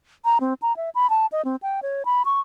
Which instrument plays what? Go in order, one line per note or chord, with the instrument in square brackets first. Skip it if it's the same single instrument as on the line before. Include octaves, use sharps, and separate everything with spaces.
[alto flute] A#5
C4
A#5
E5
B5
A5
D#5
C4
G5
C#5
B5
C#6